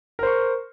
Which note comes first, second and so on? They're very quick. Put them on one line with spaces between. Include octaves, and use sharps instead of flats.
A#4 C5 C#6